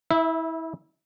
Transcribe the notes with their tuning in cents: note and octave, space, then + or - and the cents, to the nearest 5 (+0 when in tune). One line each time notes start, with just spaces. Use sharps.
E4 -25 E5 +0